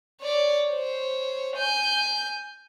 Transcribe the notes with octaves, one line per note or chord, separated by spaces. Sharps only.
C#5 D5
C5 C#5
G#5 G6